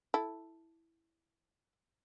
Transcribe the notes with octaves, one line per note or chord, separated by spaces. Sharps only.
E4 A4